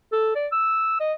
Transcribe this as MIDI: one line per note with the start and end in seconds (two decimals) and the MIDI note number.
0.12 0.31 69
0.35 0.47 74
0.52 0.96 88
1.00 1.13 75